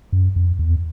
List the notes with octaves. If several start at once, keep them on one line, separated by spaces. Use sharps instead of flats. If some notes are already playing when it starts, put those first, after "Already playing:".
F#2
F2
E2